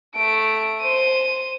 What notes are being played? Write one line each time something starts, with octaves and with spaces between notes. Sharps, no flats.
A3 D7
C5 D#7